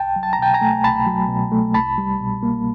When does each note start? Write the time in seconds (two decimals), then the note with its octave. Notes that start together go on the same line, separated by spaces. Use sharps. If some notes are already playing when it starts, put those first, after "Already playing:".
Already playing: C2 G5 A5
0.16 F#3
0.23 A5
0.33 A#5
0.39 B2 G5 A5
0.54 G#5 A#5
0.61 A3
0.84 C2 A5 B5
1.07 F#3
1.29 B2
1.52 A3
1.74 C2 A5 B5
1.98 G3
2.20 B2
2.43 A#3